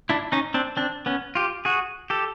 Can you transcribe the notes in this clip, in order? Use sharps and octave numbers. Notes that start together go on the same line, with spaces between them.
D4 E4
C#4 D#4
C4 D4
C4 D4
B3 C#4
F4 G4
F#4 G#4
G4 A4